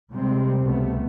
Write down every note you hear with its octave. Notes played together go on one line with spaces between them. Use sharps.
C3 G3 G#3 C4
C#2 B2 G3 A3 B3